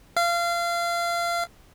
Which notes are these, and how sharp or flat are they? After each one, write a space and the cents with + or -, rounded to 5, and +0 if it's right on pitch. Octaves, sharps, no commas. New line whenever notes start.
F5 -25